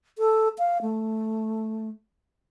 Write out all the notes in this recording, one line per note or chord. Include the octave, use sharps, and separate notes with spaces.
A4
F5
A3